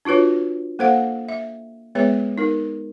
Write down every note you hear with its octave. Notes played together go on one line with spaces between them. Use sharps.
D4 F4 F#4 B4 C#5
A#3 A4 C5 F5 F#5
E5
G#3 B3 G#4 B4 C#5 E5
D#4 A#4